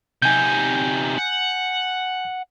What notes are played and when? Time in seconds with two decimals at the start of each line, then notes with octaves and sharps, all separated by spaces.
0.22 C3 D#4 G#5 G6
1.18 F#5